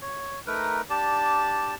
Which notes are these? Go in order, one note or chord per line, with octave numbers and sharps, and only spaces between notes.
C#5
A3 D#4 A#4 B4
D4 G4 D5 A5